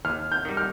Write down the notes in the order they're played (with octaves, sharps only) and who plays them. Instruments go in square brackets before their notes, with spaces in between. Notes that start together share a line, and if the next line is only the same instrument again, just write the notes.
[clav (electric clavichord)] D#2 [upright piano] F6
[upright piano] G6
[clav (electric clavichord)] D#3 G3
[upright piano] F6